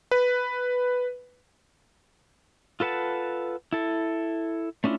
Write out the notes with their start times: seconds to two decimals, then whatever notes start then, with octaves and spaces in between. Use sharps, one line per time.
0.11 B4
2.80 F4 A4 B4 F#5 A5
3.73 E4 A4
4.84 A3 C#4 D4 E4 F4